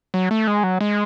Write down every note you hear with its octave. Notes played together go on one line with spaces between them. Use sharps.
F#3
A3
G#3
F#3
G#3